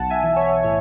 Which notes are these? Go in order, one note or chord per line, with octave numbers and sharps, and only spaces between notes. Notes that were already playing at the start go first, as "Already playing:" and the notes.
Already playing: B1 F#5 A5
E5 G#5
E3
C#5 E5
A2 C#5